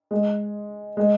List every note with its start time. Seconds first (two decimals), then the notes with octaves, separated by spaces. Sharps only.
0.11 G#3
0.97 G#3